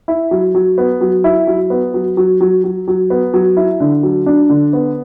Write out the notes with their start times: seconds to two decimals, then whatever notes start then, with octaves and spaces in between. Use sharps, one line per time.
0.08 E4
0.31 F#3
0.55 F#3
0.78 B3
1.01 F#3
1.24 E4
1.47 F#3
1.70 B3
1.94 F#3
2.17 F#3
2.41 F#3
2.64 F#3
2.88 F#3
3.10 B3
3.34 F#3
3.57 E4
3.80 D3
4.03 F#3
4.26 D4
4.50 D3
4.73 B3